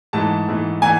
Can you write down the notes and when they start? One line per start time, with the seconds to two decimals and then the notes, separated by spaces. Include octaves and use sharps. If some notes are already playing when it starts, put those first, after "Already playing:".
0.13 G#2 E3 A3 A5
0.48 G#2 E3 A3
0.82 E3 A3 G#5